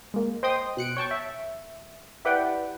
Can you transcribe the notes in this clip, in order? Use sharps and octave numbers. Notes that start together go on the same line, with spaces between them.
G#3 A#3
C5 D#5 G5 C6 D#6
B2 F#6 C#7 D7
C#5 G5 A5 C#6
E5
E4 G4 B4 D5 F#5 G5